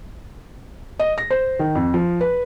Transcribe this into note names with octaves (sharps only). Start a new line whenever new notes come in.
D#5
A#6
C5
D#3
F2
F3
B4